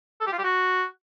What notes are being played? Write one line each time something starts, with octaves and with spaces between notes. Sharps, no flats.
A4
G4
F4
G4
F#4